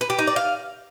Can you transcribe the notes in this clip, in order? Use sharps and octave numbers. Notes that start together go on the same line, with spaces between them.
B4
G4
D#4
D5
F5